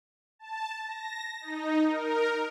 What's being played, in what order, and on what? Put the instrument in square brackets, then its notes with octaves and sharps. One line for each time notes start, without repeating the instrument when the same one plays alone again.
[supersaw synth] A5
A#6
D#4
A#4